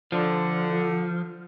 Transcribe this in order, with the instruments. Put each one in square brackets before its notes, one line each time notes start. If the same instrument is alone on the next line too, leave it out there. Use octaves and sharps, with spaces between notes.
[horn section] D3 [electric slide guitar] F3